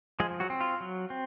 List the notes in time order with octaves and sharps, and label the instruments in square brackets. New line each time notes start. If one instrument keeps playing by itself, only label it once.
[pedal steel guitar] F3 G#3 G#4
F#3 F#4
C4
F4
F#3
C4